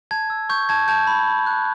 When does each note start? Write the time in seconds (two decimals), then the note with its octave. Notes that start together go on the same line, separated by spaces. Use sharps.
0.11 A5 G#6
0.30 E6
0.49 C#6 G6
0.69 A5 G#6
0.88 A5 G6
1.07 B5
1.28 B5
1.46 F#6